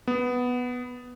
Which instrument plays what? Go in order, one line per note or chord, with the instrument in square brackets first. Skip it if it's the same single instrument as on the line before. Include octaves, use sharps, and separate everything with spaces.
[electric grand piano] B3